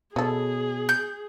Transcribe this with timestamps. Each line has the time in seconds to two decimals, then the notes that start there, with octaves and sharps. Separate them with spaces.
0.16 B2 C#4 G#4 A4
0.89 G6